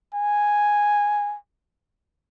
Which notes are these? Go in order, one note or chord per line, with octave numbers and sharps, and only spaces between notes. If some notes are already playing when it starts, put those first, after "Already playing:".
G#5